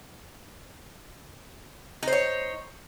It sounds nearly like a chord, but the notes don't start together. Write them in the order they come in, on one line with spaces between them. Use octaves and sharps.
D#4 C5 C#5